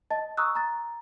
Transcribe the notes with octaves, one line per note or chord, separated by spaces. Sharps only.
D#5 A5 A6
A#5 C#6 D#6 E6 F#6
A#5 A6